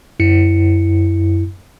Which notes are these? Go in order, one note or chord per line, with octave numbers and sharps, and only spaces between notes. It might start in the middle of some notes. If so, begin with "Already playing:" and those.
F#2 E4 C#7